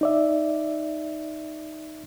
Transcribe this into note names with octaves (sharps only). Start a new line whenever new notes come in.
D#4 D5 E5